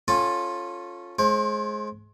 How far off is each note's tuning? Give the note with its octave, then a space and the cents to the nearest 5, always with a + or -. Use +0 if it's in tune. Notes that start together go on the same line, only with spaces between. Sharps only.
C#4 -15 F4 +10 A4 +0
G#3 +25 C5 +35